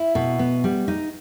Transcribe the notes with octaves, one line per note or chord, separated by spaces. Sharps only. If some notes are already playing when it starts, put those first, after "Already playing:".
Already playing: E4
B2
B3
G3
D#4